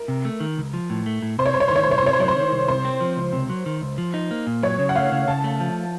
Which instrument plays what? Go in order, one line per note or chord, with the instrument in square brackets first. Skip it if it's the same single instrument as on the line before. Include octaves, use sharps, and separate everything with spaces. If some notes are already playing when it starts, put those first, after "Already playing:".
Already playing: [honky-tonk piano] A#4
[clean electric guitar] C3
A3
D#3
C#2
F3
A2
A3
A2
[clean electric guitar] C3 [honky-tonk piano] C5
[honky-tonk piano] C#5
[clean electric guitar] C2 [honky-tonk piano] C5
[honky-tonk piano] C#5
C5
[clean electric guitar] D#3 [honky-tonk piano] C#5
[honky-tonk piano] C5
[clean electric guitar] C2 [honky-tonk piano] C#5
[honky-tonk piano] C5
[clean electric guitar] C3 [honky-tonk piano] C#5
[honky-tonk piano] C5
[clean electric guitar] F#3 [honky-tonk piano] C#5
[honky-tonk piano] C5
[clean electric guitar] D#3
C2
[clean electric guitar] C3 [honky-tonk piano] C5
[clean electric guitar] C4
F3
C#2
C3
F#3
D#3
C#2
F3
D#4
A#3
A#2
[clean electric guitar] F#3 [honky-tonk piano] C#5
[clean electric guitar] C#3
[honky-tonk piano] F#5
[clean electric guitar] A3 [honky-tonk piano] F5
[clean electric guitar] C#3
[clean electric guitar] C#3 [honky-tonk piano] A5
[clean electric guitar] A3
F3